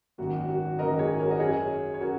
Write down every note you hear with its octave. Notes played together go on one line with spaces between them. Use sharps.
G#1 F#2 F#3 A#3 F#4
F#4
G#1 F#2 F#3 A#3 A#4 D#5
G#4 C#5
F#4 A#4
D#5
F#2 F#3 C#4 G#4 C#5
C#5
F#3 C#4 F#4 A#4